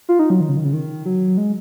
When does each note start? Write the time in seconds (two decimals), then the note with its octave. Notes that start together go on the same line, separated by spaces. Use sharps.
0.09 F4
0.19 D#4
0.30 F#3
0.41 D#3
0.49 C#3
0.57 D#3
0.65 C#3
0.73 D#3
1.05 F#3
1.37 G#3